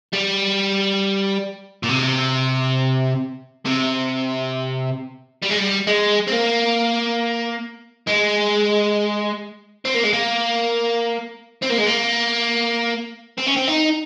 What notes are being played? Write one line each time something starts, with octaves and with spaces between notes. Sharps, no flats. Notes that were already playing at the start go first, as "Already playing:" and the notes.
G3
A#2
C3
C3
G3
G#3
G3
G#3
C4
A#3
G#3
C4
A#3
G#3
A#3
C4
A#3
G#3
A#3
C4
C#4
C4
D#4